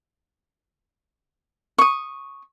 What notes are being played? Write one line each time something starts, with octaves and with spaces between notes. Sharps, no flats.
C#6 D#6